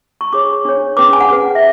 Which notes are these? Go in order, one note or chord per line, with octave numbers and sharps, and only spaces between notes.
C#6
D4 G#4 C#5 D6
D4 G#4 C#5
C#4 G#4 B4 D6
G#5
F#5
C#4 G#4 B4
E5